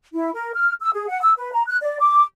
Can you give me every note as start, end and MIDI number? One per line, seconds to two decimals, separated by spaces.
0.13 0.30 64
0.34 0.51 70
0.55 0.73 89
0.81 0.90 88
0.94 1.07 68
1.09 1.19 78
1.22 1.33 88
1.37 1.51 71
1.53 1.63 82
1.68 1.77 90
1.82 1.97 74
2.00 2.23 86